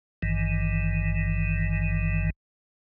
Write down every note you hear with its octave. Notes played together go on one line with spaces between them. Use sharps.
G#1 G2 D#3 E3